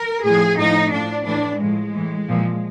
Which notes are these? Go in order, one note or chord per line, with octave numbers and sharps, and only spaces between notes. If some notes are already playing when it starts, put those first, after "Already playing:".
Already playing: A#4
A2 F3 G#4
A2 F3 D#4
A2 F3 D4
A2 E3 D4
A2 F3 G#3
A2 E3
A#2 F3